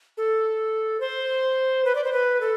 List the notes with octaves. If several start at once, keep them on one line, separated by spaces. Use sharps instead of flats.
A4
C5
B4
D5
C5
B4
A4